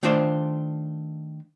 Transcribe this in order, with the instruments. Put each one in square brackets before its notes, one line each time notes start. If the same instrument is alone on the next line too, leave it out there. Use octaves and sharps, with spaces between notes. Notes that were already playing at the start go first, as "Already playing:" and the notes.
[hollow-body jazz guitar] D#3 A3 D4 F4 C5 D5